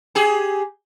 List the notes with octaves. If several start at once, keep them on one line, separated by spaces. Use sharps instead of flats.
G4 G#4